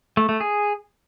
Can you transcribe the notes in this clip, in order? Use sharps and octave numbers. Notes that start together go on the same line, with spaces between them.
A3
A3
G#4